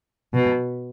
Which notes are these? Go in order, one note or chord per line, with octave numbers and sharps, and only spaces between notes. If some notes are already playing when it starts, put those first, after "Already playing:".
B2